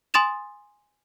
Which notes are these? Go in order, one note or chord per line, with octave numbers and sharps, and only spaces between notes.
G#5 C6 D#6 A6 E7 F7